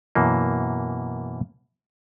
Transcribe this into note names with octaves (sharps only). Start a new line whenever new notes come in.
F#2 B2 E3 A#3